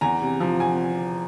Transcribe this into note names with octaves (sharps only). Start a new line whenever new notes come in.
E2 G#5 A#5
C3
F3
G#5